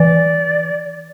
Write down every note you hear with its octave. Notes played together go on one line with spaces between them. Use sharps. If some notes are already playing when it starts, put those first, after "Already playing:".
Already playing: E3 D5